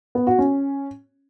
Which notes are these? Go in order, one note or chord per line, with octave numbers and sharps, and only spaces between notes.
B3
F#4
C#4